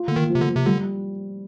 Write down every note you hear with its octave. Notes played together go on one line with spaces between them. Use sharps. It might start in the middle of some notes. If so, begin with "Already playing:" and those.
Already playing: F4
D3 A#3
D#3
F3
C3
D3
F3
C3
D3 G3